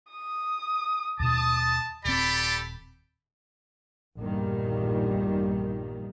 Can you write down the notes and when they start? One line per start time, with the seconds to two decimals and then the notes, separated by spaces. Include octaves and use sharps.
0.11 D#6
1.20 D#2 B2 A5 D#6
2.05 D#1 C4 G4 A4 D5 B5
4.18 A#1 E2 G2 A#2 D#3 G3